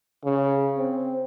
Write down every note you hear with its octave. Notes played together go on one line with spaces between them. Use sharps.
C#3
C4